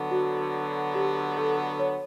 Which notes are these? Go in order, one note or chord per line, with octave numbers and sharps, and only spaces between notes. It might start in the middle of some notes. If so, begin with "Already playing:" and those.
Already playing: D3 F#3 B3
F#4
G4
A4
C#5